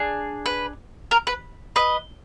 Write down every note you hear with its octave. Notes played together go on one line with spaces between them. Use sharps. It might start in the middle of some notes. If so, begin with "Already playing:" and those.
Already playing: D4 G#4
B4
A#4
B4
B4 D#5